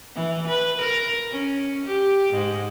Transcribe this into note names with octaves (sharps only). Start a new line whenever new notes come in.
E3
B4
A#4
C#4
G4
G#2